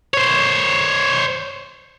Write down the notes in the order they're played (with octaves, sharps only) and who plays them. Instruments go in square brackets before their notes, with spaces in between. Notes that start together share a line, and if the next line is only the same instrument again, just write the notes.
[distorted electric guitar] C5 C#5